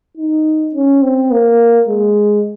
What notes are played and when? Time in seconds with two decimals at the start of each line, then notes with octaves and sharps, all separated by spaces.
0.17 D#4
0.75 C#4
1.03 C4
1.32 A#3
1.88 G#3